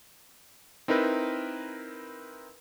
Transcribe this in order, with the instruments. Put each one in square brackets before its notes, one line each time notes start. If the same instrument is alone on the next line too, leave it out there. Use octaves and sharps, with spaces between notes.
[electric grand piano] C4 D#4 E4 A#4 B4